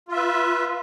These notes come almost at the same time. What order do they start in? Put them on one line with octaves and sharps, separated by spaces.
F4 E5 B4